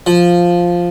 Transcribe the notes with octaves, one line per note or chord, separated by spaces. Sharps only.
F3